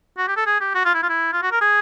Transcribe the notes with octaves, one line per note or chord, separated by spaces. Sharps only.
F#4
G4
A4
G#4
G4
F#4
F4
E4
F4
E4
F4
F#4
A#4
G#4